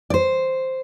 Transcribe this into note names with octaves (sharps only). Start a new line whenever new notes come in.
D5
C5